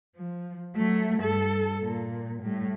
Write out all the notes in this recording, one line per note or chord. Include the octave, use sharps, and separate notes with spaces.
F3
F#3 A3
G2 A4
A#2
A2 G3